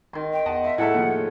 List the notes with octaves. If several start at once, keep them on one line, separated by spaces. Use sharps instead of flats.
G#1 D#3 C6
G5
E2 D#5 F#5 A5
E5 C6
A2 C#3 A3 E4 A4 E5 F#5
D#2 F3